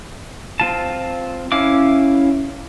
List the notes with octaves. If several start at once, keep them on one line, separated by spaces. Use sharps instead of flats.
C4 F4 A5
C#4 E4 F5 D6